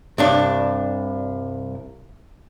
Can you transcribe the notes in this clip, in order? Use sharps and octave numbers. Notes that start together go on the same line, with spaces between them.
C2 G2 D4